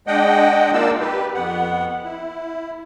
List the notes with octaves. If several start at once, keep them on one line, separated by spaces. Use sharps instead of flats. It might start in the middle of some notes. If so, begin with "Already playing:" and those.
G#3 D4 D#5 F#5 G5
A#3 D4 D#4 F4 D5 E6
G4 B4
F2 B3 F#5
E4